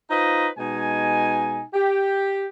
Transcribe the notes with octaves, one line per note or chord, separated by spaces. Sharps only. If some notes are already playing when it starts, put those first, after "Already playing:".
D#4 F4 B4 C5 D#5
B2 G#3 D#4 G#5
G4